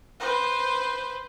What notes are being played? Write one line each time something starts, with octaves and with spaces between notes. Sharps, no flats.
B4 C5